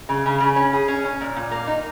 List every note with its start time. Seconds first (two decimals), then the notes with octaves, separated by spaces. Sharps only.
0.09 C#3
0.26 C#3
0.40 C#3
0.56 C#4
0.73 G#4
0.88 C#4
1.04 C#4
1.21 A#2
1.36 A#2
1.51 A#3
1.67 D#4